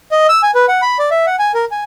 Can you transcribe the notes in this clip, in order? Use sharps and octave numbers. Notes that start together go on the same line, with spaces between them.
D#5
E6
G#5
B4
F#5
B5
D5
E5
F#5
G#5
A#4
G#5